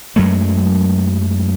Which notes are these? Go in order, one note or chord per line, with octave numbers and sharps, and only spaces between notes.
F#2 F#3 G#3 A3